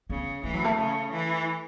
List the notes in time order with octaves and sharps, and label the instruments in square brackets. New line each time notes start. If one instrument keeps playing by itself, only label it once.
[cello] C#3 [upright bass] B3
[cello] E3 [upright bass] A3
[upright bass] F#3
A3
[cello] C#3
E3